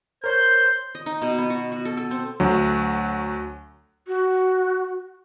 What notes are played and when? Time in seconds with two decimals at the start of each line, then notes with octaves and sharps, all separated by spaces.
0.24 A#4 C5 C#5 G6
0.95 D#5
1.06 D#4
1.22 B2
1.38 B3
1.50 F#4
1.72 F#4
1.85 A4
1.97 A4
2.11 C4
2.40 D2 D3 F#3
4.07 F#4